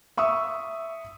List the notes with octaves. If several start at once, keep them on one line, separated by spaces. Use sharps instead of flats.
E5 C#6 D#6 E6